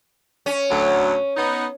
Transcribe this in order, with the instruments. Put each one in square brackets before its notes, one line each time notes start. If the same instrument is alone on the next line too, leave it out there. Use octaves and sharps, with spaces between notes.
[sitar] C#4
[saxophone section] D2 F#3
B3 D#4